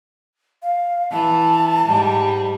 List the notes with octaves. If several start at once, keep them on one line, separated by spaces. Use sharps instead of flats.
F5
E3 A5
G#2 G3